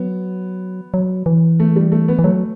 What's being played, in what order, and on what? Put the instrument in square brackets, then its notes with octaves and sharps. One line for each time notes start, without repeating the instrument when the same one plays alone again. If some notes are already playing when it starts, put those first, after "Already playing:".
Already playing: [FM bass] F#3 [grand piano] B3
[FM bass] F#3
E3
[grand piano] A3
G3
A3
B3
[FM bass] E3
[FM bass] F#3 [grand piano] A3